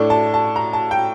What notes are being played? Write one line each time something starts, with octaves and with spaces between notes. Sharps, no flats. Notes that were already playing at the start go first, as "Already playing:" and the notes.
Already playing: A2 A3 D4
A5
A5
A#5
A5
G5